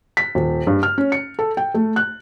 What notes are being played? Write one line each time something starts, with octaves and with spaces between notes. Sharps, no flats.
B6
D#1
G2
F6
C#4
C#7
A4
G5
A3
F#6